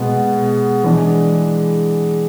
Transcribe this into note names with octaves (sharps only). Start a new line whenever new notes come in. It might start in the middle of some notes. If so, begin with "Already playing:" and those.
Already playing: B2 G#3 B3
E3 G#3 D4